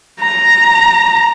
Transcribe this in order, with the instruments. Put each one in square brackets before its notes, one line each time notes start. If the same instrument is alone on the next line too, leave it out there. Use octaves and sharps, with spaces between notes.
[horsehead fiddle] A#5